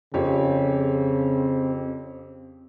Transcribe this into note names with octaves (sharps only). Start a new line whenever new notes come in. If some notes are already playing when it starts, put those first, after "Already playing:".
F2 C#3 C4 G4 C#5